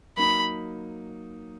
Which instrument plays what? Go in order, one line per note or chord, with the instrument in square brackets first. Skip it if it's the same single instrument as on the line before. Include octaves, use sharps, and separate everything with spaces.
[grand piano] F#3 A#3 D#4 [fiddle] B5